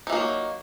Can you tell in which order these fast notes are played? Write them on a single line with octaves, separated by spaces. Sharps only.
D#4 E3 A#3 F#3